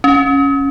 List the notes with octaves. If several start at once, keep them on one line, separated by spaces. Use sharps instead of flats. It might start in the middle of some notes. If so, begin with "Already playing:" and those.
C#4